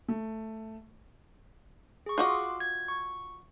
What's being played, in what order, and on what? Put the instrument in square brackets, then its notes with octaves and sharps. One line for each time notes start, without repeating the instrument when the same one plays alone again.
[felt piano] A3
[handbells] G#4 C#6
[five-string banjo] F4 F#4 D#5 [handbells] C6 D6 F#6
[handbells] G#6
C#6